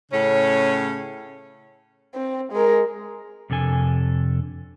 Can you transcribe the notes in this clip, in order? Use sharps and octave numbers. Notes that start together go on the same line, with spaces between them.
A2 C#3 C#4
C4
G#3 A#4
F2 C3 D4 A4 G#5